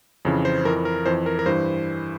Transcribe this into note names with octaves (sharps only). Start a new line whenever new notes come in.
F2 C#3 E3
C5
F2 E3 A#4
A#4
F2 E3 C5
A#4
A#4
G2 E3 C5